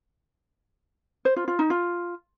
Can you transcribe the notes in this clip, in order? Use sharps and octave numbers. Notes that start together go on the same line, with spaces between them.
C5
F4
F4
D#4
F4